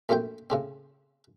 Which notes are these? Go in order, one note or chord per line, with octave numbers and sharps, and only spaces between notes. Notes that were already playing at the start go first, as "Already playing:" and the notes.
A#1 F#2 A3 C4 G5
A2 C#3 C4